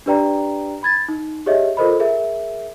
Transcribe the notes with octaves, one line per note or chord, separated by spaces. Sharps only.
D4 G4 B4 D5 G5 A#5
B5 G#6 A6
D#4
G4 G#4 C#5 D#5 E5
F4 A4 A#4 C5 D#5 B5
G#4 A#4 E5